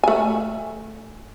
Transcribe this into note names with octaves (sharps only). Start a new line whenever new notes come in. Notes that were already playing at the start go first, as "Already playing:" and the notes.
A3 G#5